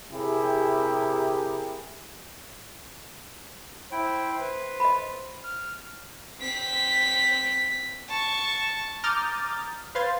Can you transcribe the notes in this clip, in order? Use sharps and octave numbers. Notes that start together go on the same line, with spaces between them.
C3 E4 G4 G#4 A#4
E4 C5 G5
B4
D#5 B5
F6
C4 B6
A5 C#6
A#5 D6 D#6 F6 G6 A6
B4 C5 F5 C6 G#6 A6